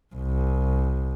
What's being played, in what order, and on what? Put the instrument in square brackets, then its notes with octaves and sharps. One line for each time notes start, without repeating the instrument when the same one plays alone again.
[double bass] C2